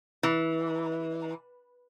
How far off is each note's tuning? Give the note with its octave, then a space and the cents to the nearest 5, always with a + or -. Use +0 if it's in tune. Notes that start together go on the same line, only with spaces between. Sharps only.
E3 -15